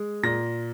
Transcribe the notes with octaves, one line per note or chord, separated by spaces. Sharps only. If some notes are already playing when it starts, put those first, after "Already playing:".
Already playing: G#3
A#2 A#6